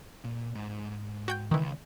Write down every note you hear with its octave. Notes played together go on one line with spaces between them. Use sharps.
A#2
G#2
F#4 G5 G6
C#2 D#3 E3